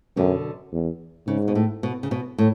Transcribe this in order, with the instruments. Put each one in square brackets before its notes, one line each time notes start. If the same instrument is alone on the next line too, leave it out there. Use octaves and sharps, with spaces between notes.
[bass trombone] F#2 [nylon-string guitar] B2 D3
[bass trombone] E2
[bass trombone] G#2 [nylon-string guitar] C#3
[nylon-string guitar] B2
A2
B2
C#3
B2
A2